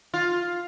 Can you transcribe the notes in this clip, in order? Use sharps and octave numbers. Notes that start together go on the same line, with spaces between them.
F4